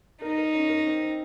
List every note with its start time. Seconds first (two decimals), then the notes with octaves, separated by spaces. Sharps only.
0.21 D#4 A#4
0.38 A#4
0.54 C#4
0.69 A#4
0.86 C4
1.02 C4